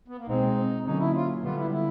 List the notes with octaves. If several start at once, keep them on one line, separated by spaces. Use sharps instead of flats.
B3
A#3
B2 G#3 C4 D#4
D3 F#3 A#3 C#4 D#4
E4
F4
D3 G3 B3 F4
E4
E4